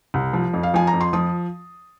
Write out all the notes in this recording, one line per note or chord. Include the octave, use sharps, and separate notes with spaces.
C2
F3
F2
F5
F3 G#5
A#5
F2
C6
F3 D#6